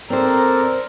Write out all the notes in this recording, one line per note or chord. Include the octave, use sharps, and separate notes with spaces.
C4 A4 A#4 C5 D5 A#5